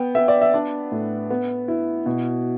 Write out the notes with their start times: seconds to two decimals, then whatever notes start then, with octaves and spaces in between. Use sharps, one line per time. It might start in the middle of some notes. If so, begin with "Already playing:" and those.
Already playing: B3 G5
0.15 B3 E5
0.28 D5
0.41 E5
0.54 D4
0.92 A2
1.30 B3
1.68 E4
2.06 B2